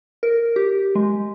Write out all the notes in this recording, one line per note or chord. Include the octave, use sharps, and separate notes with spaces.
A#4
G4
G#3